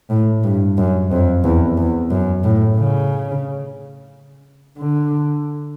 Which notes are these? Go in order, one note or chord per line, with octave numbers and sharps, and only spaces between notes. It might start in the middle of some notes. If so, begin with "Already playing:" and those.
A2
G2
F#2
F2
E2
E2
F#2
A2
C#3
D3